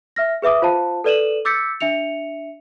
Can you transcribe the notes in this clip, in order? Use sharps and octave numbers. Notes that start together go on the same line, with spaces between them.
E5 F6 A#6
G#4 B4 E5 D6 D#6
F4 C5 F5 A5
A4 B4 D5 D#7 E7 F#7
D6 E6 G6 A6 B6 C#7
D4 E5 C#7 F7